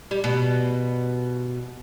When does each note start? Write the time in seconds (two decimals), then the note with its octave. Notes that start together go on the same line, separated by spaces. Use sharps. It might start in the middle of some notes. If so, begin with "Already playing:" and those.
0.11 G3
0.24 B2